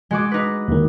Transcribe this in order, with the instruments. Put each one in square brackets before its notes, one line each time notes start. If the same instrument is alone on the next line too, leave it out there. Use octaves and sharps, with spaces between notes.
[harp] G#3 F#4 D6
D#4 B4
[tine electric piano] D#2 D#3